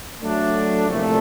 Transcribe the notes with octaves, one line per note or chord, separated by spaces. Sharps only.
F#3 A3 D4
C2 A#2 F3 A3